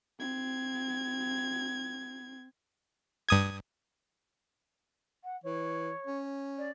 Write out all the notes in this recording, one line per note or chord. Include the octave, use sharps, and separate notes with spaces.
C4 G#6
G2 D#6 G#6
F#5
E3 C#5
C#4
D5